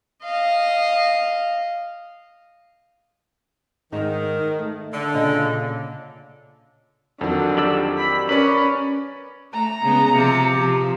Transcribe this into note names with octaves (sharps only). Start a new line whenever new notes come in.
D#5 F5
G#2 D#3 G#3 D#4
A3
D3
A#2 C#3 D#5
F2 D3 D#3 F#3
G4 D5 E6
B5
C#4 A#4 B4 D5 B5
A3 A#5
C#3 G#3 B3
C3 F3 G4
F3